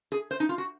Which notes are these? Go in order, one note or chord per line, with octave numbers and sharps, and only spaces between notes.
G#4
C5
D#4
F4
F#4